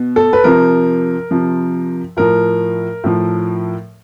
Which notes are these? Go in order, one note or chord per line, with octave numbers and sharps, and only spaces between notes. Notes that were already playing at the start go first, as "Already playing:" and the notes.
Already playing: B2
A4
B4
C3 F3 A#4
C3 F3
A2 F3 A#4
A2 F3